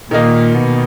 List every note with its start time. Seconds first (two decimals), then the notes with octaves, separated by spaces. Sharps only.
0.11 A#2 D#3 A#3 D#4
0.54 B2